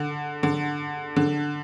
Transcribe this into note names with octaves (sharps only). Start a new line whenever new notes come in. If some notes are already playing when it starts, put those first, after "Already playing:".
Already playing: D3
D3
D3